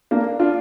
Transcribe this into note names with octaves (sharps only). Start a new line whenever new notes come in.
A#3 D4
D4 F4